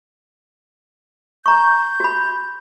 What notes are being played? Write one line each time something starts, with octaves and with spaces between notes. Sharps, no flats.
A#5 C#6 G6
F#4 B5